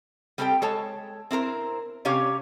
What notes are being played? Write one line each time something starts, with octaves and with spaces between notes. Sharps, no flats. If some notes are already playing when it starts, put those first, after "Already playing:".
G3 C4 G4 A4 C#5 G5
G#3 A4 C#5 A5
C4 E4 A#4 C5
C3 G3 C#4 G4 C#5 F5